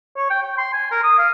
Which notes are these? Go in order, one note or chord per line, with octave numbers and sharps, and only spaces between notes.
C#5
G5
G5
C6
G#5
A#4
D#6
F5